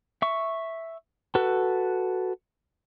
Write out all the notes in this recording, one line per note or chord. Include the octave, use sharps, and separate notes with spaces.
E5 C#6
F#4 A4 B4